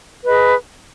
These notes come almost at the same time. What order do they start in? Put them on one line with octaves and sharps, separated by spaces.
B4 D#5 G#4